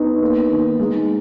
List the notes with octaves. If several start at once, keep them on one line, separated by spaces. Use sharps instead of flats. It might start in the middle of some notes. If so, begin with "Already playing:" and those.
Already playing: B3 D#4
A#3
D#3
G#3 D#4